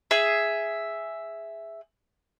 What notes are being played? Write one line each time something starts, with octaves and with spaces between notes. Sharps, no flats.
G#4 E5